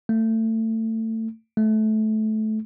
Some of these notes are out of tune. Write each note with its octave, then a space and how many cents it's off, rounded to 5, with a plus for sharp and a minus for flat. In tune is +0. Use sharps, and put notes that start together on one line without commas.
A3 +25
A3 -20